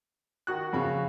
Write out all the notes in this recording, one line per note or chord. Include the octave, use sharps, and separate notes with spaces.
D#3 F#4 F#6
F2 C#3 B5